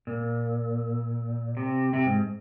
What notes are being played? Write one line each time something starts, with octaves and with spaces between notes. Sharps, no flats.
A#2
C3
C3
G#2